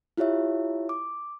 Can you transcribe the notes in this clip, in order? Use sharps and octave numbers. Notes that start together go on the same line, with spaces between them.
E4 F4 G4 C#5 E5
D6